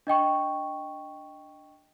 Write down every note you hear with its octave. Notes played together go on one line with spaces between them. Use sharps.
D4 D#5 G5 C#6